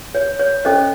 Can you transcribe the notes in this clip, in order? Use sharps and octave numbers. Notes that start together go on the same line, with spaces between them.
C#5
C#5
C#4 A4 C5 D#5